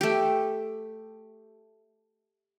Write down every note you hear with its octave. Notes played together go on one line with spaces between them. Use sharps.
A3 G4